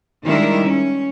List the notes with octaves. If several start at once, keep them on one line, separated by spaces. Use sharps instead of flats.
D#3 G3 G#3 D4 E4 A#4
C#4